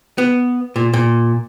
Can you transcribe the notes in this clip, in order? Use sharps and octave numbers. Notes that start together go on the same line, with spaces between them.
B3
A#2
A#2